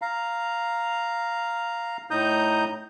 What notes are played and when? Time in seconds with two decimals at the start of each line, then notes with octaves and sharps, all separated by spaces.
0.02 F5 A#5
2.11 A2 D#4 A#5 D#6 G6